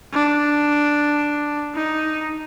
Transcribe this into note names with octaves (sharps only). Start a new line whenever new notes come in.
D4
D#4